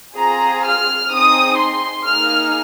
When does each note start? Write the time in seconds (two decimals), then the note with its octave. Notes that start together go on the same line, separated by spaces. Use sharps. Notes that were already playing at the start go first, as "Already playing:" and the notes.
0.16 C4 F4 G#4 A#5
0.63 F6
1.10 C4 D#4 G#4 D#6
1.57 C6
2.04 A#3 D#4 G#4 F6